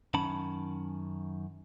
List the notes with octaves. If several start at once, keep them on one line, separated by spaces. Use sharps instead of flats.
F#2 D#3 C#4 A5 B5